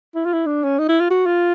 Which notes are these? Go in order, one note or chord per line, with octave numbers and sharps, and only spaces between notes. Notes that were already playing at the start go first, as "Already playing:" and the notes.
E4
F4
E4
D4
C#4
D#4
E4
F4
F#4
F4